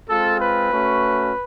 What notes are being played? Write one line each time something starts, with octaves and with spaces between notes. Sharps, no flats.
G#3 C4 F4 A4
B4
A3 C#4 F#4